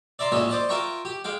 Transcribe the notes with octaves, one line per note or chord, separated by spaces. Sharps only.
D5 E5 A#5 C6
A1 A#2 G#3 C#5 D#5 E5
C5 D5 D#5
F4 A#4 E5 G5 A#5 C#6
G4
G#3 F5 G5